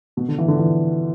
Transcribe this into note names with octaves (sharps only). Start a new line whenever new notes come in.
B2
D3
E3
D3
E3